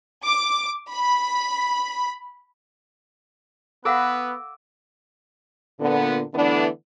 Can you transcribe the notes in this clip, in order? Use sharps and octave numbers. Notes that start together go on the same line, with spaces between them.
D6
B5
B3 A4 B4 F5 F#5 D6 E6 A#6
A#2 D3 B3
D3 E3 A3 B3 D4